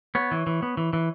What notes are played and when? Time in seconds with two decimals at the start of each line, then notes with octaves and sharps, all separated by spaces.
0.15 B3 C#5
0.31 E3
0.47 E3
0.63 B3
0.77 E3
0.93 E3